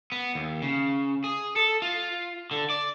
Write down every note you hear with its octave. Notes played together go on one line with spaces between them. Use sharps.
B3
D#2
C#3
G#4
A4
F4
D3
D5